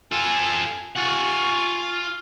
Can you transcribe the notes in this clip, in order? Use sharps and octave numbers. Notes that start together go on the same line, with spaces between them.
F4 A4 G#5
F4 F#5 G#5 C#6